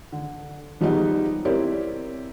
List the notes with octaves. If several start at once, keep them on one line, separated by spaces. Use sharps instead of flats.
D3
F3 G3 G#3 B3 D#4
C4 E4 G4 A#4 C#5 D5